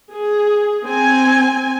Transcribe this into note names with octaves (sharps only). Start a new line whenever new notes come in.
G#4
C4 G#5